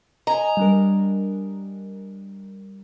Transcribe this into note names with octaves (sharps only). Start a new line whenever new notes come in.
D#5 G#5 A#5
G3 D4 A#4